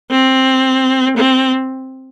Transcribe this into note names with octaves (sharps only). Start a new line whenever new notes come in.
C4
C4